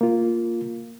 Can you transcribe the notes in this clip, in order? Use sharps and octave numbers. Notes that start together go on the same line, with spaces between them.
A#3 F4